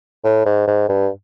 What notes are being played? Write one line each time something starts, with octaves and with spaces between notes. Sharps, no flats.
A2
G#2
G#2
G2